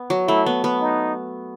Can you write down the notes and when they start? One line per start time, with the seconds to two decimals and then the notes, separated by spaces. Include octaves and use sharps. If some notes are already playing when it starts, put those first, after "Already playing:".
Already playing: B3
0.10 F#3
0.28 A3 E4
0.46 B3
0.64 B3
0.81 D#4